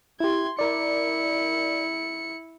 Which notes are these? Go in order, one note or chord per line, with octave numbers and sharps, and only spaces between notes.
E4 G4 C6 G#6
E4 A#4 D5 C#7